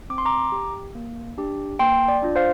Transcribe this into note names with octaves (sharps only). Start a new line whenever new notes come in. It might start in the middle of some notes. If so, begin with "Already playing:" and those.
C4 D6
C6
A#5 D6
G4
A#3
D4 G4
A#3 G5 C6
D5
D4 F4
C5 F5